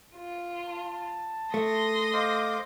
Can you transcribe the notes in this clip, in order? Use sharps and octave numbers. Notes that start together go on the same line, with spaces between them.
F4
A5
A3 C6 D#6 A#6
C5 D#5 F5 D6